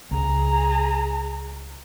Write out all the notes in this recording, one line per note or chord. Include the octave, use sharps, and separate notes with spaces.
C#2 G#4 A#5